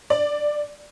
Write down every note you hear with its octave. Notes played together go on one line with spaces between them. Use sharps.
D5